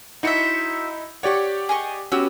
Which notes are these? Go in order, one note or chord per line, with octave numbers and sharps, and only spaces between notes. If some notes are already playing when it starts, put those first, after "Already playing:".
D#4 E4 F#4 C5 E5 C#7
G4 C#5 D5 F#5 C#6
G#4 D#5 C#6
B3 C#4 F#4 G4 E6